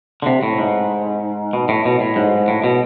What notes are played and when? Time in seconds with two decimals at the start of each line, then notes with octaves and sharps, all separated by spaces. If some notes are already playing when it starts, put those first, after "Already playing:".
0.22 D3
0.26 C3
0.43 A2
0.58 G#2
1.53 B2
1.69 A2
1.85 B2
2.00 A2
2.16 G#2
2.48 A2
2.64 B2